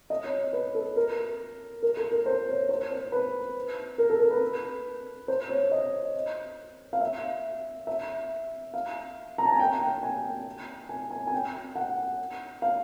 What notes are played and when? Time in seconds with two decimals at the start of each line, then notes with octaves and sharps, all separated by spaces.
0.10 D#5
0.24 C#5
0.53 B4
0.75 A4
0.96 A#4
1.83 A#4
1.97 A4
2.12 A#4
2.26 C5
2.47 C#5
2.69 C5
2.91 C5
3.12 B4
3.98 A#4
4.10 A4
4.20 A#4
4.31 B4
5.28 C5
5.49 C#5
5.71 D#5
6.93 F5
7.01 E5
7.87 E5
8.74 F5
9.38 A#5
9.45 A5
9.52 G#5
9.60 G5
9.81 G5
10.03 G#5
10.89 G#5
11.11 G#5
11.27 G#5
11.32 G5
11.75 F#5
12.62 F5